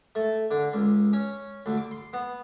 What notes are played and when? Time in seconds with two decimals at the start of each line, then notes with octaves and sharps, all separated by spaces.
0.15 A3
0.51 D3
0.73 C#2
1.13 C#4
1.66 D2
1.77 D6
1.91 C6
2.13 B3